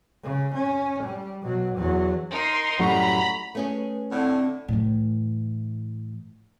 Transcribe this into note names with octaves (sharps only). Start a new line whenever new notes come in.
C#3
C#4
G3
B2 F#3
E2 F#3
D#4 A#4 C6
F#2 A2 G3 F#5 A#5 B5 C#6
A3 C#4 G#4 B4
A2 D3 C4
A2 E3